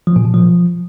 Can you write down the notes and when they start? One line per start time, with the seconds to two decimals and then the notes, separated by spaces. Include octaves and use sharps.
0.07 F3
0.16 A#2
0.25 B2
0.34 F3